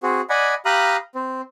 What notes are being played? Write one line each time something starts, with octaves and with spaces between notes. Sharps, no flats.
C4 F#4 G#4
D5 D#5 F#5 G#5 B5
G4 F5 A#5 B5 D#6 F#6
C4